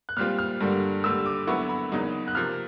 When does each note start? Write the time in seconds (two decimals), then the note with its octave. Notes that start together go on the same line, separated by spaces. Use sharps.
0.09 F#6
0.16 A#2 G3 C4 F4 F6
0.38 F6
0.60 G2 D3 G3 A#3
1.04 D#2 D3 G3 E6
1.26 D6
1.47 D3 F#3 B3 E4 C#6
1.69 B5
1.92 E2 C#3 F#3 A#3 D#4
2.28 F#6
2.35 C3 F3 A#3 F6